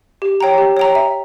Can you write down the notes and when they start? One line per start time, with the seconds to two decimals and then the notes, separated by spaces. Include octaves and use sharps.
0.22 G4
0.41 C#5 G5 A#5
0.58 G4
0.77 C#5 G5 A#5
0.95 E5